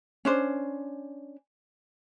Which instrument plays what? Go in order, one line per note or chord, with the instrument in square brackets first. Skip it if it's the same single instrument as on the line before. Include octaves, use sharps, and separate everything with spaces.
[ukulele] C#4 D4 C5